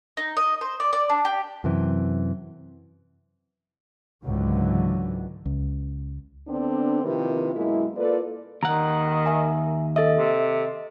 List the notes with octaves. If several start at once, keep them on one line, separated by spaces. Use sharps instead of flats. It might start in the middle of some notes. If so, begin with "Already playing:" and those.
D#4
D#5
C5
D5
D5
D4
G4
F#2 C3 E3
C#2 G#2 D3 E3 F#3
C#2
D3 B3 C4 D4
C3 D#3 F3 A#3 E4 B4
F#2 B2 G#3 A#3 E4
A#3 F4 A4 B4 D5
D#2 D#3 F#5 A#5
E5 G#5
A4 D#5 E5 A6
C3